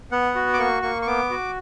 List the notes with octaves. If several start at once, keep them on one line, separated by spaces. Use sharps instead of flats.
B3 F#5
F#4
D6
A#3 C#6
A#3 C#6
C#6
B3 D6
F#4